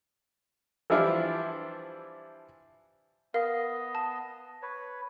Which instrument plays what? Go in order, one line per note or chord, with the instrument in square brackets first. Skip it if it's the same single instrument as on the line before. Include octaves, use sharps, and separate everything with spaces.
[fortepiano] E3 F3 G3 D4 E4 F4
[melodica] B3 D#5 [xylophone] A#4 F5
[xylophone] A5
[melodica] B4 C#5